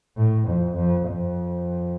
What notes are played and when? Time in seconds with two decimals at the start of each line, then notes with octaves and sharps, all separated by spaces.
0.17 A2
0.47 F2
0.76 F2
1.06 F2